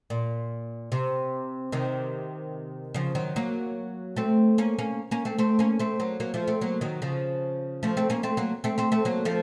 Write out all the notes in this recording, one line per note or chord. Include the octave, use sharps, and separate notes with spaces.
A#2
C3
C3 D#3
C#3 F3
D#3 F#3
F#3 A#3
A3 C4
A#3 C#4
A#3 C#4
A#3 C#4
A3 C4
A3 C4
A#3 C#4
A3 C4
F#3 A#3
F#3 A#3
F3 A3
A3 C4
F#3 A#3
D#3 F#3
C#3 F3
F3 A3
A3 C4
A#3 C#4
A3 C4
F#3 A#3
A3 C4
A3 C4
A3 C4
F#3 A#3
F3 A3